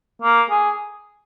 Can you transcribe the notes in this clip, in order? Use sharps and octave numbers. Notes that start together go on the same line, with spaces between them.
A#3
G#4